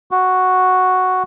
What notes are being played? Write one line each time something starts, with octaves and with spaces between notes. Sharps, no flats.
F#4